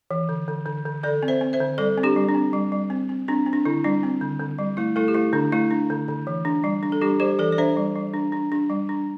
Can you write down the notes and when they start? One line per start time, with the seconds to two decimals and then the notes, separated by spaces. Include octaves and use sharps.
0.11 E3
0.29 D3
0.48 D3
0.66 D3
0.86 D3
1.03 D3 A4 D5
1.23 C4
1.28 C5 E5
1.41 C4
1.53 C5 E5
1.60 D3
1.78 G3 A4 D5
1.98 C4
2.03 D4 G4
2.16 G3
2.29 D4
2.35 C4
2.53 G3
2.72 G3
2.90 C4
3.09 C4
3.28 C4 D4
3.46 C4
3.53 D4
3.65 D3 E4
3.84 G3 D4
4.03 C4
4.21 D3
4.40 D3
4.58 G3
4.77 A3 E4
4.96 A3 E4 A4
5.08 G4
5.14 A3 E4
5.33 D3 D4
5.52 A3 E4
5.71 D4
5.90 D3
6.08 D3
6.27 E3
6.45 D4
6.64 G3
6.83 D4
6.92 A4
7.01 G3 D4 G4
7.20 G3 G4 C5
7.39 E3 A4 D5
7.52 D5
7.58 D4 C5 E5
7.77 G3
7.95 G3
8.14 D4
8.32 D4
8.52 D4
8.70 G3
8.89 D4